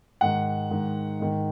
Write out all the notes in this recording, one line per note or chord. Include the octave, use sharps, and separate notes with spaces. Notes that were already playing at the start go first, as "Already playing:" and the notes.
G#2 D#3 F#5
G#2 D#3
G#2 D#3